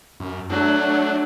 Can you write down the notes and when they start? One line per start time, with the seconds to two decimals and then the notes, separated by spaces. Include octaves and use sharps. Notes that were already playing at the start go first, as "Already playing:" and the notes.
0.20 F#2
0.50 F#3 A3 D4